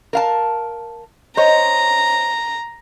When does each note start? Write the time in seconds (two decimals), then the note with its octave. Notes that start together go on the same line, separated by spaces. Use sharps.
0.13 A#4 F5 A5
1.37 C5 C#5 D#5 A#5